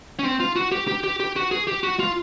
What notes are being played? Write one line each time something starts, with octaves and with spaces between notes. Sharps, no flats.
C#4
C4
F4
F#4
G4
G4
G4
G4
F#4
G#4
G4
F#4
F4